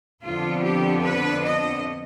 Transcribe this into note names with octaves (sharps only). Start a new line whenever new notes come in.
F2 D3 F3 B3 F4
G4
B4
D#5